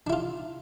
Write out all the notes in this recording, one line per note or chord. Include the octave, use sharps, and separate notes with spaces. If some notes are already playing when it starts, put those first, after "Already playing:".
D4 E4 F4